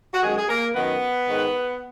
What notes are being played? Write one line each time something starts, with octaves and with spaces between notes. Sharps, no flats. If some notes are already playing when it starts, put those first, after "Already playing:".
F#4
F#2 D#3 G#3 G#4
G#4
A#3 A#4
F#2 D#3 B3 B4
G#2 D#3